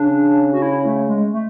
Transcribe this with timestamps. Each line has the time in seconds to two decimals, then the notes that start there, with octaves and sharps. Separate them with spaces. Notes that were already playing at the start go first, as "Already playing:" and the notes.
Already playing: C#3 D4
0.52 F#4
0.62 E4
0.85 A3
1.08 G#3
1.33 A3